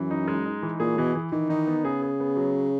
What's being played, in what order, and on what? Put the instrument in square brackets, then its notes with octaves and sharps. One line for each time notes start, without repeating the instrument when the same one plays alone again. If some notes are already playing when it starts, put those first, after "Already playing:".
Already playing: [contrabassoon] F#2 [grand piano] E3
[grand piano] D#4
G#3
D#4
E3
[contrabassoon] A#2 [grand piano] G#4
[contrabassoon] B2 [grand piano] E3
[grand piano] E3
[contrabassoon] D#3 [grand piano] E3
[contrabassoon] D#3 [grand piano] D#4
[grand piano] B3
[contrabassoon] C#3 [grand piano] G#4
[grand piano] G#4
B3
F#3